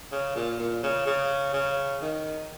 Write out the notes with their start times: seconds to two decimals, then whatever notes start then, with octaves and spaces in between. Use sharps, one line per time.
0.12 C#3
0.36 A#2
0.59 A#2
0.83 C#3
1.06 C#3
1.53 C#3
2.02 D#3